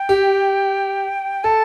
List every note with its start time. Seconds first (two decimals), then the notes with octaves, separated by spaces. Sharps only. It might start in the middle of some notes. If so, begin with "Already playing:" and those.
Already playing: G5
0.09 G4
1.44 A4 A5